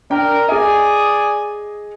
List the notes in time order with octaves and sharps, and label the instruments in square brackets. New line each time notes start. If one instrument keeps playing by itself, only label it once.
[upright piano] D4 G5 [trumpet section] A#4
[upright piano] G#4 D#5 [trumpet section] D5 G#5 D#6